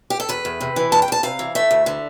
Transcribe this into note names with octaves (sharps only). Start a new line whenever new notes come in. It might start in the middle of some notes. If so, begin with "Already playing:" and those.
G4
A4
E2 B4
E2
C3
E3
E2 A5
G5
E2 A5
C3 F5
E3
A3 E5
D2
D3